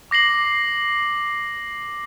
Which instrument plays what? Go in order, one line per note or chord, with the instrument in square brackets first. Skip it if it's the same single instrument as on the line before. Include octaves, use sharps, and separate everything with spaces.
[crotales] D6 A#6 C7 F#7